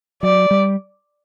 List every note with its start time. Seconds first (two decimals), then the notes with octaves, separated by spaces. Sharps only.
0.23 F#3 D5
0.51 G3